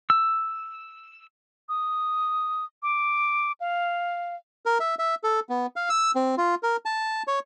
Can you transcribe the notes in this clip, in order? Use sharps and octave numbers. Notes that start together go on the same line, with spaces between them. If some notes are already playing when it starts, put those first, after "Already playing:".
E6
D#6
D6
F5
A#4
E5
E5
A4
B3
F5
E6
C4
F4
A#4
A5
C#5